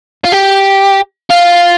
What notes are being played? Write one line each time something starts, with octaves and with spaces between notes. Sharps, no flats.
F4
G4
F4